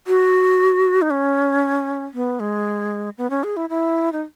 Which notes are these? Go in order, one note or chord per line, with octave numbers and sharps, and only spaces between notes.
F#4
D#4
C#4
B3
G#3
B3
C#4
G#4
E4
E4
D#4